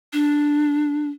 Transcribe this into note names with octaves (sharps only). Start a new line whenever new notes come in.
D4